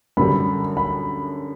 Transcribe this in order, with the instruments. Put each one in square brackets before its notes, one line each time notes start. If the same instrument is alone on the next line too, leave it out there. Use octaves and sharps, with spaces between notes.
[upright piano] F#2 D3 G3 [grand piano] B5
[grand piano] B5